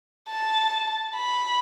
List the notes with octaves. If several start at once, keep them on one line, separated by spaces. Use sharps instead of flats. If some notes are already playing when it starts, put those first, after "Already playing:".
A5
B5